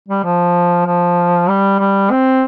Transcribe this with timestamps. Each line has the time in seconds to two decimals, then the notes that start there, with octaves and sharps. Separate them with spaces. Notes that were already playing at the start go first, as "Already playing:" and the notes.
0.08 G3
0.24 F3
0.86 F3
1.49 G3
1.80 G3
2.11 C4